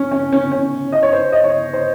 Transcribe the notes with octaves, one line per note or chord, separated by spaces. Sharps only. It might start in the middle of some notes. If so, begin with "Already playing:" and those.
Already playing: C#4
C#4
C#4
C#4
D#5
C#5
C5
D#5
C#5
C5